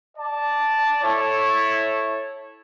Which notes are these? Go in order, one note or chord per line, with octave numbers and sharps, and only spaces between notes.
D5 A5
E4 A4 C#5